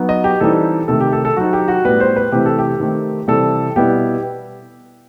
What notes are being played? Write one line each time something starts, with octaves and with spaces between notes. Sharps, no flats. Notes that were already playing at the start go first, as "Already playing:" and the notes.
Already playing: F#3 B3 D#4
D#5
G4
E3 G3 C4 D#4 A4
C3 D#3 A3 A4
G4
A4
A4
F#3 C4 D#4 F#4
G4
F#4
A2 G3 B3 B4
C5
B4
C3 E3 A3 C4 G4
A4
G4
D#3 A3 C4
C3 E3 G3 C4 A4
B2 G3 B3 E4 G4